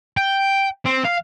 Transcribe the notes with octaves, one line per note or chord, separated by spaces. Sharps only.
G5
C4
F5